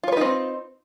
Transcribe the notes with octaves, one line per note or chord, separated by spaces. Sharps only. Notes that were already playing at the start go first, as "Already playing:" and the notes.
C4 D#4 F4 B4 C#5